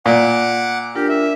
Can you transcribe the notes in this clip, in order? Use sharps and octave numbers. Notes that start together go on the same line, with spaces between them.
A#2 F#5 D6
D4 F4 G4 A#4
E5